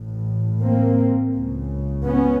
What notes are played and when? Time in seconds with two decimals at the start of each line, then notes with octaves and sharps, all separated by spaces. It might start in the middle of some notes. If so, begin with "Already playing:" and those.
Already playing: A1 A2
0.63 A#3 C4
1.34 C#2 C#3
2.05 B3 C#4